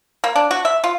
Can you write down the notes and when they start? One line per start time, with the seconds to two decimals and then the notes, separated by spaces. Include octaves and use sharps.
0.24 A#3
0.36 D4
0.51 F#4
0.65 E5
0.84 F4